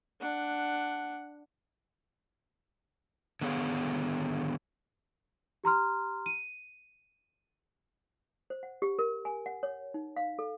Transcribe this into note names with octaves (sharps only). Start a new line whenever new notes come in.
D4 F#5
D3 D#3 B3 G#4 C#5 F5
G4 A#5 C6 F6
D#7
C5
F#5
G4
A#4
G#5
F#5
C#5
D#4
F5
A4